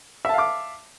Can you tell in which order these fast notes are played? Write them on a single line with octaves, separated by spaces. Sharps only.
E5 A5 F5 D6